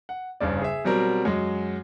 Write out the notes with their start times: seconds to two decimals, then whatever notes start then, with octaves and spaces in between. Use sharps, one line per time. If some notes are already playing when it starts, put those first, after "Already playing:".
0.09 F#5
0.40 F#1 G2 C#3 D5
0.62 G#4 E5
0.85 B2 F#3 G3 C4 A#4
1.25 F#2 F#3 G#3